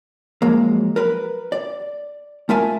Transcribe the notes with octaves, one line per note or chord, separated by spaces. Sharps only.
F3 F#3 G#3 A#3
A#4 B4
D5
A3 F4 A#4 E5 G#5 A5